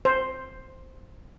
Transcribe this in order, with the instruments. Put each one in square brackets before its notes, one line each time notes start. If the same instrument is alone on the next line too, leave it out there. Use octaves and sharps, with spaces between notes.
[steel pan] C5